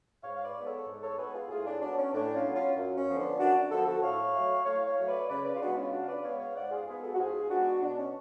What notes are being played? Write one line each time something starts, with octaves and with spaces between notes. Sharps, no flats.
G#2 C#5 F5
F5
B4 D5
G#3 B3
A4 C#5
G#2
A4 C#5
G#3 B3 G#4 B4
F4 G#4
A2 F4 G#4
D4
F#3 B3 D4
C#4
A2 D4
C#4 F4
F#3 B3
C#4 F4
F#2
C#4
D3 F3 B3
D4
F#2 D4 F#4
D3 F3 B3 F#4 A4
F#4 A4
A2 C#5 F5
F#3 A3
A2 C#5 F5
C#5 F5
F#3 A3
B4 D5
C#3 B4 D5
B4 D5
F4
G#3 B3 D4 F#4
C#4 F4
C#3 D4 F#4
F5
B4 D5
G#3 B3 C#5 F5
C#5 F5
G#2 D5 F#5
F4 G#4
G#3 B3 F4 G#4
F#4 A4
F#4
G#2 F4 G#4
G#3 B3 D4 F#4
B2 D4
C#4